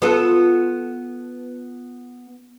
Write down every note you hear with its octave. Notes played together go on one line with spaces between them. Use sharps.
B3 F4 A4